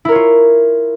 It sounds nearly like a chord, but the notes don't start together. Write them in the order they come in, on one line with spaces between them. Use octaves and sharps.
E4 A#4 C#5 F4